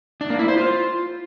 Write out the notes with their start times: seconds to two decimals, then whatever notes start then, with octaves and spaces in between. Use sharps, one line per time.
0.21 D4
0.30 A#3
0.39 E4
0.48 C5
0.57 F4